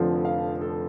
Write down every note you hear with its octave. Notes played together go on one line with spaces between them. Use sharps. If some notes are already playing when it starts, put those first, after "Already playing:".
Already playing: F1 F2 D3 F3
F5
A4